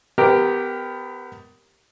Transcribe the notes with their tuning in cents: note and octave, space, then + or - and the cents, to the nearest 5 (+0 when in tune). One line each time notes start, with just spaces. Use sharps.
B3 +25 G4 +0 A#4 +0